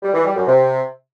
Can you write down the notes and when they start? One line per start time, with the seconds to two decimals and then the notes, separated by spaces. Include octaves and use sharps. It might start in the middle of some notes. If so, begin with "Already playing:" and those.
0.03 G3
0.14 E3
0.25 G3
0.36 F#2
0.47 C3